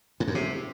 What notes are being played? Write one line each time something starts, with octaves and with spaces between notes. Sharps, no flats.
G#2
F#2
C3